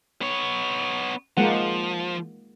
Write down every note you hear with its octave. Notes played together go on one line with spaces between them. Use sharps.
B3 C#5
F3 G#3 A#3 F#5